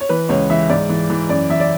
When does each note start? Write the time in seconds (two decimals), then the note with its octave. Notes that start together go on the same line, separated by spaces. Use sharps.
0.01 C#5
0.09 E3 B4
0.29 C#2 C#5
0.50 E3 E5
0.70 G#2 D5
0.89 E3
1.10 E3
1.29 F#2 D5
1.49 E3 E5
1.60 D5